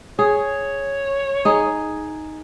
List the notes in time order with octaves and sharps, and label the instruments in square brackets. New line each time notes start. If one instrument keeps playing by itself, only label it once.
[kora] G#4 [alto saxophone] C#5
[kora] D#4 G#4